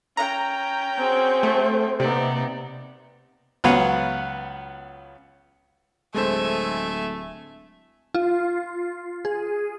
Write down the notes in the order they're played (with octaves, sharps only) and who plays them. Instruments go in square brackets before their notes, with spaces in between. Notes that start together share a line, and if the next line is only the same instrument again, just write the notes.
[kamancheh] C#4 G5 [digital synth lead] A#5
[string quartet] C4 F#4 G#4 [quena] C5
[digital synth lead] A3
[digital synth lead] C3 [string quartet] A#3 B3 D#4 [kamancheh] D5
[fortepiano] C#2 F#3 B3 B4 C#5 F5
[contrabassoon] D1 [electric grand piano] G#3 A4 C5 [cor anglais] A3 [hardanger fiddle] E5 G#5
[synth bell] F4
G#4